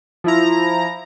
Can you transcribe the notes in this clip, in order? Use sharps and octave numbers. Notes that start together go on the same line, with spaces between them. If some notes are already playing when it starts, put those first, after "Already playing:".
F3 E4 A#5